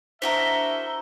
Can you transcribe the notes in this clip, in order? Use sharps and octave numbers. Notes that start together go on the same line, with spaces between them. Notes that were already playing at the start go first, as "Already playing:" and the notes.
D4 E4 F#4 A#4 C5 D#5 E5 G7